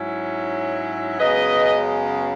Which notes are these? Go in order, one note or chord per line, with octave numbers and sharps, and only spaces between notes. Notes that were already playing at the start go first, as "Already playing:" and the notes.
Already playing: G#2 F#3 C#4 E4
F#2 C#3 G#3 B3 B4 D#5